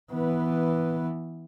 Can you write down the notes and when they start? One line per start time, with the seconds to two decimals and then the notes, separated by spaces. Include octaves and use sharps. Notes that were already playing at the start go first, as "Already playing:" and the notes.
0.12 E3 B3